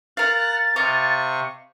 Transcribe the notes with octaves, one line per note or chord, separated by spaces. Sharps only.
A#4 F5 F#5 F6 F#6 A6
C3 D#5 F5 C#6 D6